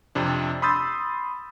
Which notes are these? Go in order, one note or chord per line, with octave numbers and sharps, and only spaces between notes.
F2 C3 D4
B5 C6 D#6 E6 G6 A6